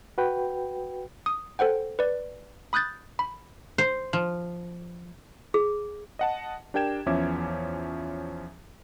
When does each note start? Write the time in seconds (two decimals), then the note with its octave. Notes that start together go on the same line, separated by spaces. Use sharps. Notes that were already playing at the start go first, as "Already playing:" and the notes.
0.18 F#4 B4 G5
1.26 D#6
1.59 A4 C5 F#5 G5
1.99 B4 D5
2.73 B5 D#6 F#6 G6 A6
3.19 B5
3.78 C5
4.13 F3
5.54 G#4
6.19 D#5 F#5 A5
6.74 D4 G4 A#4 G5 G#6 E7
7.06 E2 F3 C#4 E5 D6 G#6